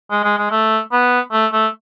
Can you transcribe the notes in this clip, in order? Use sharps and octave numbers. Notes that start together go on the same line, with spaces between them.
G#3
G#3
G#3
A3
B3
A3
A3